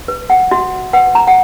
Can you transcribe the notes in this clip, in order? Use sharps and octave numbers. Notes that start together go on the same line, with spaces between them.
B4
F#5
F#4 E5
B4 F#5
A#5
F#5